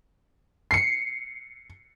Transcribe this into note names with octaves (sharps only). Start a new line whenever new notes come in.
C7 C#7